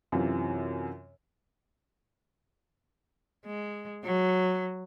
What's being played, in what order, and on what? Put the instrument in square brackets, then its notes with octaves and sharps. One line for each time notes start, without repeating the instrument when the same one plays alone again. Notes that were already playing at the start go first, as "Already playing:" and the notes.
[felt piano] F#2 C3 E3 F4
[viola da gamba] G#3
F#3